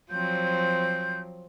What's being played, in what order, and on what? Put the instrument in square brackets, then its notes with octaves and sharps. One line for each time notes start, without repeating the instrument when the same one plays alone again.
[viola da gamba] F3 F#3 C4 [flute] G6